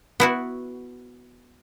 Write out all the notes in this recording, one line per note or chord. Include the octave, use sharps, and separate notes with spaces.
B3 E4 F#4